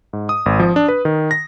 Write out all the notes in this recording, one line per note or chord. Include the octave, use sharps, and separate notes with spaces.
G#2
D#6
G#1
F3
D4
B4
D#3
A#6